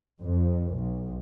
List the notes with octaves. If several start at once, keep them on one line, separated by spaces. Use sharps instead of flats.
F2
B1